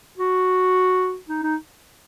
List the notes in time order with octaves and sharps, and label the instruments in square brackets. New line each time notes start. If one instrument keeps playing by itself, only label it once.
[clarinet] F#4
D#4
D#4